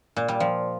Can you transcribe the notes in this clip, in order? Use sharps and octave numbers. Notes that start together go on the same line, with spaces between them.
A#2
G3
F3